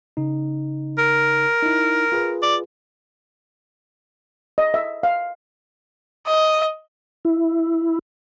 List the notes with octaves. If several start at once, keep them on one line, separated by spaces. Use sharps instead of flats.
C#3 D#4
A#4
D#4 E4
F4 G#4 B4
D5
D#5
E5
F5
D#5
E4